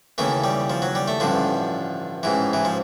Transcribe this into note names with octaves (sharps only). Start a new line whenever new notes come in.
D#2 C#3 E3 A3
G3
F3
F#3
G3
A3
A1 G2 D3 F3
A1 G#2 E3
E3
F3